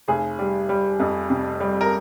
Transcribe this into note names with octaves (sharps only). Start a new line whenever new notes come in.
F1 G#4
G3
G3
F2
C3
G3
A#4